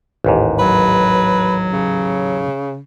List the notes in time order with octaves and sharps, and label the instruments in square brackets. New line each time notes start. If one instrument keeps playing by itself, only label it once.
[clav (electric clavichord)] A1 D#2 G#2
[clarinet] F#3 [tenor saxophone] B4
[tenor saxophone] C#3